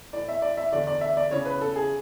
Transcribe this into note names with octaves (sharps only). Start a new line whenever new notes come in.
A2 E3 D5
E5
D5
E5
E2 D3 D5
D5
E5
D5
E2 C#3 E3 C#5
B4
A4
G#4